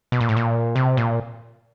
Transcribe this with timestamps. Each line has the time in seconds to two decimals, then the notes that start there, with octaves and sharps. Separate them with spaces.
0.12 B2
0.21 A#2
0.29 A2
0.37 A#2
0.76 C3
0.97 A#2